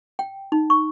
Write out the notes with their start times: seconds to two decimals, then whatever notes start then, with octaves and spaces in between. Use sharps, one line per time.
0.19 G5
0.52 D#4
0.70 C#6